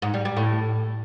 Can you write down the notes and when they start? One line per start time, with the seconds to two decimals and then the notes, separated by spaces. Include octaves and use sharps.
0.02 G#2
0.14 G3
0.25 G3
0.37 A2